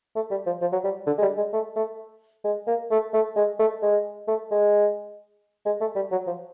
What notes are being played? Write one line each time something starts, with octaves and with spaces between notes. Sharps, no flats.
A3
G3
F3
F3
F#3
G3
D3
G#3
G3
G#3
A3
A3
G#3
A#3
A3
A3
G#3
A3
G#3
A3
G#3
G#3
A3
G3
F#3
F3